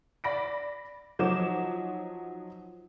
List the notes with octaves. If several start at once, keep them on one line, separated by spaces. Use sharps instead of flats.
D5 B5 A#6 D7
F3 F#3 D#4 D6 E7